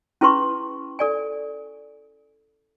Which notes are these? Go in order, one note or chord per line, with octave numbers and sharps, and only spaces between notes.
C#4 E4 G#4 B4 C6 C#6
A4 D5 G#5